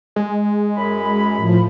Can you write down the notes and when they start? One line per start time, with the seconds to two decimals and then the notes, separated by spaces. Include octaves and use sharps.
0.16 G#3
0.76 F#2 B5
1.36 A2 F3